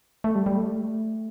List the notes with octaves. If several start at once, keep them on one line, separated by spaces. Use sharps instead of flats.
A3
G3
G3
A3